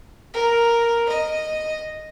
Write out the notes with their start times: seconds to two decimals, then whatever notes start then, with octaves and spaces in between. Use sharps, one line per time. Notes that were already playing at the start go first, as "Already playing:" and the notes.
0.34 A#4
1.08 D#5